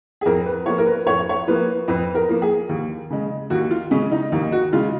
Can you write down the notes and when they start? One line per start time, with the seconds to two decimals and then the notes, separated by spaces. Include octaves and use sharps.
0.21 G#4
0.26 F2 A#4
0.46 B4
0.66 F3 A#3 C#5
0.78 A#4
0.87 B4
1.07 F2 C#5
1.29 C#5
1.47 F3 A#3 B4
1.88 F2 B4
2.15 A#4
2.29 F3 A#3
2.42 G#4
2.69 D#2
3.10 C#3 G#3
3.50 D#2 F#4
3.71 F4
3.91 C#3 G#3 C#4
4.12 D#4
4.32 D#2 D#4
4.52 F#4
4.72 C#3 G#3 F4